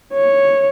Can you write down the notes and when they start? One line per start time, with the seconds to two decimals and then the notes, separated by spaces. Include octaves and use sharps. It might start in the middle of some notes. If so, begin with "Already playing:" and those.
0.13 C#5